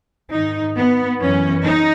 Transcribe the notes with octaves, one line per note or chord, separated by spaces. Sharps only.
G#2 D#3 D#4
B3
F#2 E3 C#4
D#4